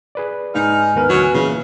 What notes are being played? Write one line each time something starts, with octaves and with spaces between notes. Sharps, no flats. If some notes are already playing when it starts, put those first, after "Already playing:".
G#4 B4 D5
G#2 D#4 G#5 F6
D#2 B3 A#4 B4
D2 E3 F#3
A#2 C#3 E3